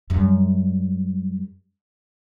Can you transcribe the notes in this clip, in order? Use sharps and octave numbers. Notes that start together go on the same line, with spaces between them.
F#2 G3